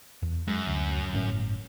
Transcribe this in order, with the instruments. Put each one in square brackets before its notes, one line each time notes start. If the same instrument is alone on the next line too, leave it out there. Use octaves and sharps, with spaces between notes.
[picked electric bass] E2
[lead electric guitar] F#2 [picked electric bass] G#3
[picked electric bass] D2
G1 A2 C#4